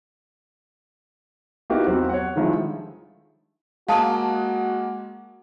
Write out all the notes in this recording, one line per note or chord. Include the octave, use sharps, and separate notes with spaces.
A#3 B3 D#4 E4 F#4 G4
E2 F#3 C4 F#4
C#5 F#5
D3 D#3 F3 G3 G#3 E4
G#3 A#3 F#4 F5 A5 D#6